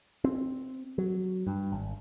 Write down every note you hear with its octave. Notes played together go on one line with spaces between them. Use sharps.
C4
F#3
G2
G#1